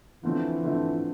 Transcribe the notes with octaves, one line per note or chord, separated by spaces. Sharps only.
D3 E3 F3 A3 C4
D3 F3 A3 C4